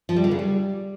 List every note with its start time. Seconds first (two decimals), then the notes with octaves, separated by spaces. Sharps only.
0.09 F3
0.16 G3
0.24 D3
0.31 C#3
0.39 G3